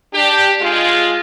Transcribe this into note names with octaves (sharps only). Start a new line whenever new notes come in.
D4 G4
G#3 F4